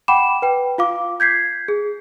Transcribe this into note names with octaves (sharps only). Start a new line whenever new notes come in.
F#5 G5 B5 D6 E7
B4 G5
F4 F5 D6
G6 G#6 B6 C7
G#4